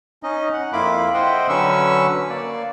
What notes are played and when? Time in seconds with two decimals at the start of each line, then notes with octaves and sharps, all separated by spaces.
0.23 C#4 D#4 D#5
0.53 F#5
0.73 F2 A#3 E4 F4 B5 D6
1.14 C5 D#5 E5 F#5 G5
1.49 D3 F#3 C#4 B4 C#6 E6
2.30 A#3 D5